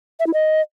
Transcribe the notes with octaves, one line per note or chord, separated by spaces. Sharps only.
E5
E4
D#5